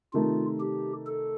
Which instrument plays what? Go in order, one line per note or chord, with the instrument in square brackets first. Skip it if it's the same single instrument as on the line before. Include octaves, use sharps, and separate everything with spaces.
[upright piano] C3 D#3 A3 D#4 A#4 [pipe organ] F4
[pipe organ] G4
A4